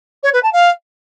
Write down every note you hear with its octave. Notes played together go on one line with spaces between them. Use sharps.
C#5
B4
A5
F5